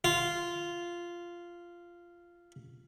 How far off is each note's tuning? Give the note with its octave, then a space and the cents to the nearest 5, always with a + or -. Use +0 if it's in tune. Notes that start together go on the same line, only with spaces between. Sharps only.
F4 -10